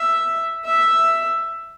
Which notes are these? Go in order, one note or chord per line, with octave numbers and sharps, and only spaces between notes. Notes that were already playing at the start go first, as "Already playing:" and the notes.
Already playing: E5
E5